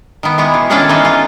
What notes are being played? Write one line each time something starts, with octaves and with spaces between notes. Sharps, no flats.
D#3 B3
E3 G#3 B3
B2
D#3 G#3 C#4 D4 F4 A4
E3 D#4 F4 F#4
F4